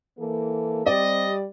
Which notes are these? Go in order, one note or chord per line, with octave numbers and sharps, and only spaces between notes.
E3 A#3 A4
G3 C4 G4 D5 D#5